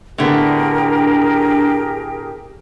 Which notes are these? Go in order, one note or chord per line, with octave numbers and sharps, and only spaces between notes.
A2 D3 B3 D4 G4 G#4 A#4